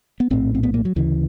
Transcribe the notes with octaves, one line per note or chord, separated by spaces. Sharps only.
B3
A#1 A2 C4
C4
B3
A#3
F#3
D2 C#3 E3